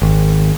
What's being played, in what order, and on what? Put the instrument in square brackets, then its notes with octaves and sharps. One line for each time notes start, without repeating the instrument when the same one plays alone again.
[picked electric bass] G#1